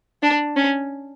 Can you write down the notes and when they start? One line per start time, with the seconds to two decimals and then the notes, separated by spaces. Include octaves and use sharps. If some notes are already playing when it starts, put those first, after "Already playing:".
0.23 D4
0.56 C#4